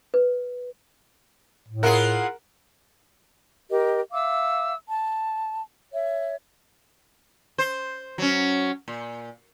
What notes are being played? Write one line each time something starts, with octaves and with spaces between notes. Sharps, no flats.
B4
A2
E4 F4 G#4 A#4 F#5
G4 A#4 D#5
E5 F5 D6 E6
A5
C#5 E5
C5
F#3 C#4
A#2